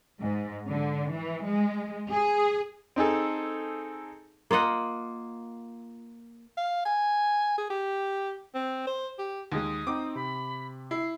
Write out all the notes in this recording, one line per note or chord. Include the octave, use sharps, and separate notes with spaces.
G#2
D3
E3
G#3
G#4
C4 D#4 G#4 A4
A#3 F4 D#5 F#5
F5
G#5
G#4
G4
C4
C5
G4
D#2 G#3 D#6
C4 D#4 D6
C3 B5
E4 C7